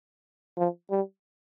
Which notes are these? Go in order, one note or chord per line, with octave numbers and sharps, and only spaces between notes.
F3
G3